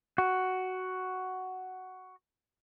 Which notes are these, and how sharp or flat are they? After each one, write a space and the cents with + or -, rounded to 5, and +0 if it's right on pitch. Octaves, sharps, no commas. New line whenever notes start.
F#4 +5